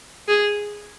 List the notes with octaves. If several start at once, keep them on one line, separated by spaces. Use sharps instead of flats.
G#4